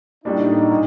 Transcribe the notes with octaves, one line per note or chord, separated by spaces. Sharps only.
A2 G3 A#3 D4 D#4
A#2